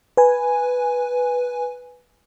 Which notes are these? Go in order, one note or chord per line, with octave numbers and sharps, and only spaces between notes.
B4 G#5